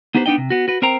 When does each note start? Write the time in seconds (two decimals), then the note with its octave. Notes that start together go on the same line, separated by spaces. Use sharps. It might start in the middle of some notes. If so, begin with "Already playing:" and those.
0.15 B3 D#4 G4 B4 C5
0.26 B3 D4 D#4 D#5 G5
0.38 C3
0.50 B3 F#4
0.68 F#4 B4
0.82 C4 A#4 C5 G5 A#5